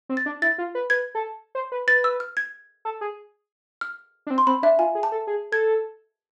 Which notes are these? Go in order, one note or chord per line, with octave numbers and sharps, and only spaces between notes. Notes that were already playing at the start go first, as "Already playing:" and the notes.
C4
A6
D4
E4 A6
F4
B4
B4 G#6
A4
C5
B4
B4 A6
E6
F6
G#6
A4
G#4
F6
D4
C4
C6
C4 B5
D4 E5
F4 G#5
G#4
A5
A4
G#4
A4 G#6